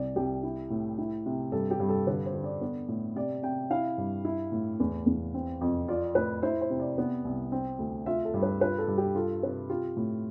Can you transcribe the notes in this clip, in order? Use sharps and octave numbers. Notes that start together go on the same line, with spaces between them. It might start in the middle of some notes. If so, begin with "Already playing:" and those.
Already playing: C2 D5
C2 G4
E4
A2
E4
C3
G2 A4
G4
G2
A4
D3 B4
C5
D3
D5
B3
A2
C3 D5
C3 G5
E4 F5
G2
E4
A2
E2
E2
C4
F2
F4 D5
A2 B4
E4 C5
C5
C3
D5
B3
C2
C4
D2
F4 E5
A4
G2
B4
F4 B4
A4
G2
G4
F4 A4
C3 B4
F4 G4
A2